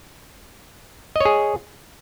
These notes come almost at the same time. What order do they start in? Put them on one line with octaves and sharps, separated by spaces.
D#5 C#5 G#4